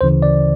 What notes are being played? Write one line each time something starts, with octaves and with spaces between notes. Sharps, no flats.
D2 C#3 E3 C5
D5